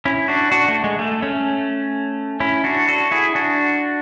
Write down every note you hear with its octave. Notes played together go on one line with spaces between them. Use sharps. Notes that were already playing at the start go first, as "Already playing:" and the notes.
C#4 E4
D4 F#4
D4 F#4
A3
G#3
A3
A3 C#4
C#4 E4
D4 F#4
F#4 A4
E4 G#4
D4 F#4